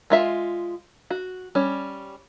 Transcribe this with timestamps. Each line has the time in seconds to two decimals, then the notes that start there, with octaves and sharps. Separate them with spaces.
0.10 G#3 F4 E5
1.10 F#4
1.55 G3 C#4